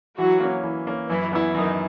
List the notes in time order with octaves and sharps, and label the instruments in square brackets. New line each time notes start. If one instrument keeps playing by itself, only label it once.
[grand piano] E3 [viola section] F#3 F#4
[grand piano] A#3 C#4
E3
A#3 C#4
[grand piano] F#2 [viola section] E3 E4
[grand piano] E3 B3 E4
[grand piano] F#2 [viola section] D#3 D#4